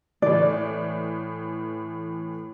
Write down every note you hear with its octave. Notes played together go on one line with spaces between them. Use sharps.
A2 E3 D5